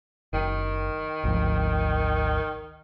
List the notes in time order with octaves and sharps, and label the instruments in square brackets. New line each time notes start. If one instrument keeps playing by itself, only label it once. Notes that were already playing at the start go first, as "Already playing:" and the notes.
[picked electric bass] F#1 [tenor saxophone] D#3
[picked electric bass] G#1 D2 F3